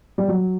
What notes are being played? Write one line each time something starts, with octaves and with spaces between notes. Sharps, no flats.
G3
F#3